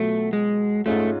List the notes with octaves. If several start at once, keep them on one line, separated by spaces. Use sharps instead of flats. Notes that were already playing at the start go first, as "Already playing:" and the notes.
Already playing: B2 F#3 A3 B3 F4 A4
G#3
G#2 G#3 A3 C#4 F4